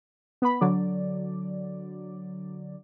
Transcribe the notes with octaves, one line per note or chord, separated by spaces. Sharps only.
B3 B5
D3 F#3 D5